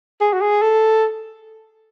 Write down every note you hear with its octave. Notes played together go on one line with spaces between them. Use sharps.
G#4
F#4
G#4
A4